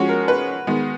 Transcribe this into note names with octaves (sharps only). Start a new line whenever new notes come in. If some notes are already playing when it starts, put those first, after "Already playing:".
Already playing: F3 G#3 C#4 F#4
A#4
B4
D#3 G#3 B3